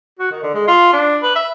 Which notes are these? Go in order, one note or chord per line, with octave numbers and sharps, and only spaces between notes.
F#4
D#3
D3
G#3
F4
D4
B4
E5